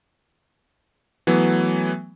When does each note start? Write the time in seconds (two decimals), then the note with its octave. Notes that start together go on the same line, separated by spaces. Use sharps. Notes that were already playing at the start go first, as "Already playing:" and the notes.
1.27 E3 F#3 A3 B3